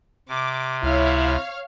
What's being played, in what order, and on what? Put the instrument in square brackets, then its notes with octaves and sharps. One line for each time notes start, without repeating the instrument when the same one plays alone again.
[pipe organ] C3 [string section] D6
[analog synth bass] C#2 [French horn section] E4 [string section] C#5 F5